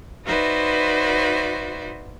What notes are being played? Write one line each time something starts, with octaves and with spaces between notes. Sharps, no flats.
D#4 F#4 B4 C5 D5 E5